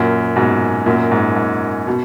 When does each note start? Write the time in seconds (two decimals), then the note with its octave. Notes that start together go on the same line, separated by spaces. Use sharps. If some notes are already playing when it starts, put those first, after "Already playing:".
Already playing: F#2 A#2
0.36 G#2 B2
0.86 F#2 A#2
1.11 G#2
1.36 G#2
1.87 B2